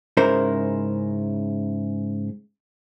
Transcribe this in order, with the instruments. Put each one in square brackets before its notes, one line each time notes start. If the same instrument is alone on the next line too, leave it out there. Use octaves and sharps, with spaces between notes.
[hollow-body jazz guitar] G#2 C#3 E4 A#4 C5